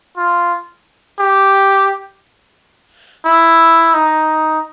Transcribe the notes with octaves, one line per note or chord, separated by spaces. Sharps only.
F4
G4
E4
D#4